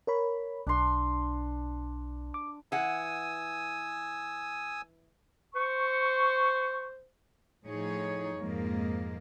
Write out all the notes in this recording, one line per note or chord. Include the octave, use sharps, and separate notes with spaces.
A#4 C#5 B5
B1 D4 C6
D6
E3 F#5 G#5 D#6 E6
C5 C#6
A2 F3 D#4 G#4 C#5
F2 G#2 G#3 A#3